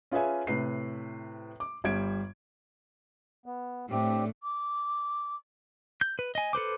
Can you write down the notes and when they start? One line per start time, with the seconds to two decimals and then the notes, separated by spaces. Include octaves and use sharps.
0.12 C#4 F4 G#4 B4 E5 G#5
0.47 A2 C3 B4 C7
1.60 D6
1.84 G1 G3 G#6 D7
3.46 B3
3.91 A2 A3 C4 D4 G4
4.42 D6
6.01 G6
6.19 B4
6.35 D#5 G#5
6.53 A4 B4 C5 D6